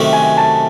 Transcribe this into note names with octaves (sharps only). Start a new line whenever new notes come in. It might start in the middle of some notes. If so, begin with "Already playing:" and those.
Already playing: C3 D#3 F#3 A3 C#4
G#5
A5